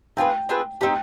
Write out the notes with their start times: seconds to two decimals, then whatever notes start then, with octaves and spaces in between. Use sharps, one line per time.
0.17 C4 F4 G#4 B4 G5
0.49 C4 F4 G#4 B4
0.81 C4 D#4 G4 G5